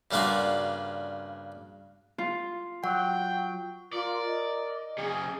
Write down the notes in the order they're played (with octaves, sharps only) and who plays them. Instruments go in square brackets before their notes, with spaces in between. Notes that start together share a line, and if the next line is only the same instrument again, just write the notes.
[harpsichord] G2 C#3 A#3 D4 F4 F#4
[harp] F4
[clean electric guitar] F#3 [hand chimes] F#5 [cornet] G5
[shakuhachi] F4 [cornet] A#4 [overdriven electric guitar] D5
[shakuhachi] D#5
[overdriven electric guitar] C#3 F#3 [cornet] G#4